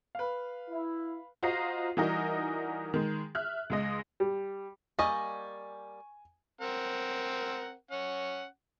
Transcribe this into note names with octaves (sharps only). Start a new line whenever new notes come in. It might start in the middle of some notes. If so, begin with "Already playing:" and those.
B4 F5
E4
F4 F#4 C5 D#5 A#5 C7
E3 G3 D#4 F#4 A#4 D#5
D#3 G#3
E5 F6 F#6
C#2 G#3 D#5
G3
G3 A#3 D#5 G#5 C#6
C4 A#4 F#5
C#4 F#5